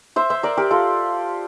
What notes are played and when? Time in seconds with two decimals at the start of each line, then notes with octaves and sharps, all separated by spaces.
0.16 C5 E5
0.30 C5 E5
0.43 A#4 D5
0.57 G4 A#4
0.71 F4 A4